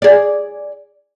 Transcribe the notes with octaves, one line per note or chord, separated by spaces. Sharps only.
G#4 D5